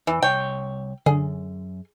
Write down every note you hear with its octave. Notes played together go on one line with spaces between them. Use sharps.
E2 E3
C2 C#5 G5
F#2 D3 G#4